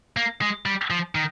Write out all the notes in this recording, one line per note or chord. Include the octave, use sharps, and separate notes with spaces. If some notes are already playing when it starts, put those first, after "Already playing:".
A#3
G#3
G3
F3
D#3